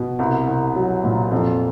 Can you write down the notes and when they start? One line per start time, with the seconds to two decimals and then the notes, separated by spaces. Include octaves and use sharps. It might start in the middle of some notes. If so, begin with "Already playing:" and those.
Already playing: B2
0.19 C2
0.48 C2
0.75 F#3
1.04 A#2
1.31 F2